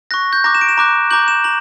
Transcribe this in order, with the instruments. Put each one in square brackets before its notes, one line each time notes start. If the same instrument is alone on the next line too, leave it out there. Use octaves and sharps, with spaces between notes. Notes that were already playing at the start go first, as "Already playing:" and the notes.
[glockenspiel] C#6 F#6 A#6
G6
A#5 D6 F#6 A#6
E7
D7
E7
A#5 D6 F#6
A#5 D6 G6 F#7
E7
A#5 F#7